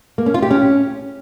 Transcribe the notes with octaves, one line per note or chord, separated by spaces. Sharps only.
A#3
C#4
F4
G4
C#4